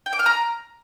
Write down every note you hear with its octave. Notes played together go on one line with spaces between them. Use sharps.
G5
D6
F6
A#5